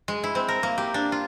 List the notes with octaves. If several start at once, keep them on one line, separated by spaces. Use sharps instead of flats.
G#3
E4
C4
A#4
A#3
G4
D4
F4